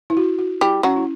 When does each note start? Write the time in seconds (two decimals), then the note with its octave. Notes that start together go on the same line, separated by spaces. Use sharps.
0.10 E4
0.17 F#4
0.39 F#4
0.61 G3 E4 G4
0.83 F#3 C#4 F#4
0.96 E4